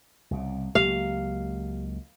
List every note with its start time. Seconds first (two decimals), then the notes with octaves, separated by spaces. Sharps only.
0.31 C2 C#3
0.75 C#2 F#3 A#3 G4 F5